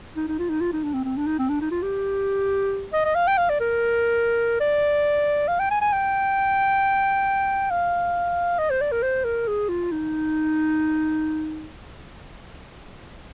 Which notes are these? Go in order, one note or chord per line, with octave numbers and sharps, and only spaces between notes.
D#4
D#4
F4
D#4
F4
D#4
D4
C4
C4
D4
D#4
C4
D4
D#4
F4
G4
D#5
D#5
F5
G5
F5
D5
A#4
D5
F5
G5
G#5
G#5
G5
F5
D#5
C5
D5
A#4
C5
A#4
G#4
F4
D#4